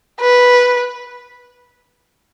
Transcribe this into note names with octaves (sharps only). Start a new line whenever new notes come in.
B4